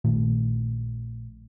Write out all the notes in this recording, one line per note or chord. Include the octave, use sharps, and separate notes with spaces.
A#1 A#2 D#3 A3